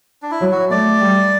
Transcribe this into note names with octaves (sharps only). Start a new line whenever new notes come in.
D4
E4
F#3
F#4
A3 D5
G3